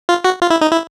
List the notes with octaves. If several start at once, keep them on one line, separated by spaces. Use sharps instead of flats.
F4
F#4
F4
E4
D#4
E4